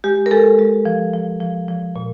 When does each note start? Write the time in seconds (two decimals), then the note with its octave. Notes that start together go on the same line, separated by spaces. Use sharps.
0.04 G#3 G4
0.26 A#4
0.31 G#3 A4
0.59 G#3
0.85 F3
1.13 F3
1.41 F3
1.68 F3
1.96 A#2